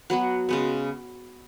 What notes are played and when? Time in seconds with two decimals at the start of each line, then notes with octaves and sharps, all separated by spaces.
0.10 F#3 B3 F#4
0.49 C#3 G#3 B3